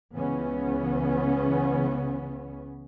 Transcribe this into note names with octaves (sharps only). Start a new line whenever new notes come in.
C#2 C#3 E3 B3 C#4